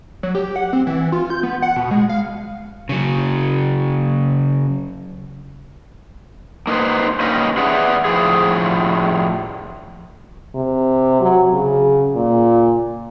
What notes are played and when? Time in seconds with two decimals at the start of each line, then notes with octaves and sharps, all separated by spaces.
0.23 F#3
0.35 G4
0.56 F#5
0.73 C4
0.87 E3
1.12 F4
1.30 G6
1.43 B3
1.62 F#5
1.76 B2
1.91 G#3
2.09 F5
2.89 C#3 F#3
6.67 A#3 D#4 F4 B4 C5
7.20 A#3 C#4 D#4 G4 B4 D#5
7.58 G#4 B4 D5 E5 F#5
8.05 A2 F3 G#4
10.55 C3
11.20 F#3
11.53 C#3
12.16 A#2